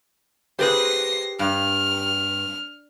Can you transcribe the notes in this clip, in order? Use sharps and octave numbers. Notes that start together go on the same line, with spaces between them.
G4 G#4 B4 C5 A#6 C7
G2 F6